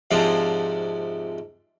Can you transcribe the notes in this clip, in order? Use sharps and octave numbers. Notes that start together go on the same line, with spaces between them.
F2 G#2 C3 F3 D4